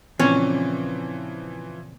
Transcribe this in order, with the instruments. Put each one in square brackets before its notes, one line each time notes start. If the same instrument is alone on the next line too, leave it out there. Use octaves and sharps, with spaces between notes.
[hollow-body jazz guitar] A#2 C#3 C4 [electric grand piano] E3 F3 [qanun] C#4